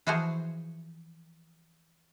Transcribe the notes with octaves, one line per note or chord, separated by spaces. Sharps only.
E3 F3 F#4 G#4 C5